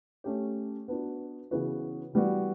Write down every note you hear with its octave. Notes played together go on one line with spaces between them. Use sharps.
A3 C#4 G4
B3 D4 F#4
C#3 E3 B3 F#4 B4
E3 G3 B3 F#4